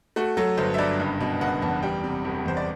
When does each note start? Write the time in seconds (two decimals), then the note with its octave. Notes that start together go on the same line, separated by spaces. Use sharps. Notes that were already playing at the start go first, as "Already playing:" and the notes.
0.16 A3 F#4
0.37 F#3 A4
0.57 G1 C5
0.74 E5
0.78 G2 D5
1.00 F#1
1.20 B2
1.41 F#1 F#5
1.62 E2 A5
1.83 G3 G5
2.04 C3
2.24 E1
2.46 E2 C5
2.57 D5